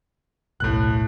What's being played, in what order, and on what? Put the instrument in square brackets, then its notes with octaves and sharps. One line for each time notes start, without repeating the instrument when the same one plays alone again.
[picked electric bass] D#1 B1 [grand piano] A2 F#6